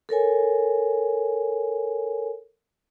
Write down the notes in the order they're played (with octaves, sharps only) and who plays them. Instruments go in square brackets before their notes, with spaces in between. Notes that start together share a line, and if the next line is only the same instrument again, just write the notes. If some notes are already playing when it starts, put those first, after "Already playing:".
[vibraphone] A4 A#4 C#5 G#5